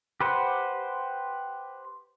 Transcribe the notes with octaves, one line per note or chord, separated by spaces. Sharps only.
G4 B4 C5 F#5